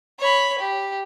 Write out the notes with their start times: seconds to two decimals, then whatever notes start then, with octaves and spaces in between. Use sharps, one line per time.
0.19 C#5 B5
0.59 G4